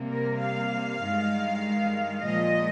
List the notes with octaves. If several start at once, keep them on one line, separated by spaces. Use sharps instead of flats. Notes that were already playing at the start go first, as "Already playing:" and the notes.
Already playing: C3 G3 A#3
A#4
F5
G2 D#3 G#3
A#2 F3 G#3 D#5